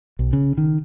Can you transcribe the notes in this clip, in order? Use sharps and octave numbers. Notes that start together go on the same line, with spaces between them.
B1
C#3
D#3